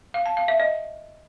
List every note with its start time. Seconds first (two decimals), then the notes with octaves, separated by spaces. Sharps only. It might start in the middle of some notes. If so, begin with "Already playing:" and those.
0.14 F5
0.26 A5
0.37 F5
0.48 E5
0.60 D#5